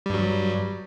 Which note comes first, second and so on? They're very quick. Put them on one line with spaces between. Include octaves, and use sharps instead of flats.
G3 G2 F#3